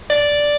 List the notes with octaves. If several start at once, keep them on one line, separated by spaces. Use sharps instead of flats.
D5